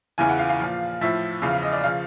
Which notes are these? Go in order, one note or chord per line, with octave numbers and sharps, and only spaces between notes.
E2 C#3 E3 G#5
F#5
F5
F5
A#2 F3
A2 F3 E5
E2 C#3 F3 F5
F5
D#5
D5
C#3 F3 F5